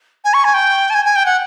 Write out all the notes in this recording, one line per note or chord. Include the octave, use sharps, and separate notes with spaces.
G#5
C#6
G#5
G5
A5
G#5
G#5
G5
F#5